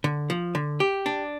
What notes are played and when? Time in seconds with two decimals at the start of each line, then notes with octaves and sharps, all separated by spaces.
0.04 D3
0.30 F3
0.55 D3
0.80 G4
1.06 D4